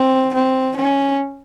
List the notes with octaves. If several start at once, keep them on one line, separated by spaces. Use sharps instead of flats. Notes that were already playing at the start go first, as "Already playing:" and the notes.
Already playing: C4
C4
C#4